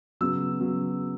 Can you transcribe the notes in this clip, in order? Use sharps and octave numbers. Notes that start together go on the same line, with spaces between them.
C#3 F#3 B3 E6
C#3 F#3 B3